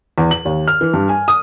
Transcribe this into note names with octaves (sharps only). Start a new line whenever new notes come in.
E2
F#7
D#2
F6
E3
G2
G#5
D#6